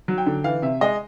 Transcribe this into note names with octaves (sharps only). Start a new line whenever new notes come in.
F#3
G5
D3
E3 F5
C3 E5
G#3 D#5